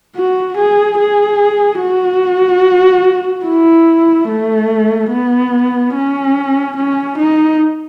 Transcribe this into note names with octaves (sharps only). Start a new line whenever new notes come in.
F#4
G#4
G#4
F#4
E4
A3
B3
C#4
C#4
D#4